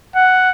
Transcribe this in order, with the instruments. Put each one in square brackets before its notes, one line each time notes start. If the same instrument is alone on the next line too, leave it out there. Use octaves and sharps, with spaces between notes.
[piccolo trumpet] F#5